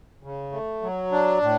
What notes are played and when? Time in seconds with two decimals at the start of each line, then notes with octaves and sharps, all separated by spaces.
0.23 C#3
0.52 A3
0.82 F#3
1.12 D4
1.43 A2